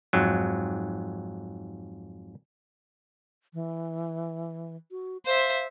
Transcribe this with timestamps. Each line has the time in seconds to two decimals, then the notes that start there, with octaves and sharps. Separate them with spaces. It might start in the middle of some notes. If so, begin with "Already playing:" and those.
0.13 F2 G#2 F#3
3.54 E3
4.91 F#4
5.25 C5 E5 F5